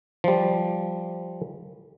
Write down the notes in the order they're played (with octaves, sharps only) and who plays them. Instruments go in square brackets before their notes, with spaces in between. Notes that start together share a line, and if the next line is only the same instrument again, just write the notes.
[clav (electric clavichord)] F3 G3